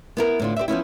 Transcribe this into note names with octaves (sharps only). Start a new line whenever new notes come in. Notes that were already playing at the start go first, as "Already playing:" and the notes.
B3 E4 A#4
A2 D3 F4
G4 C5 D5 E5
F3 B3 C#4 E4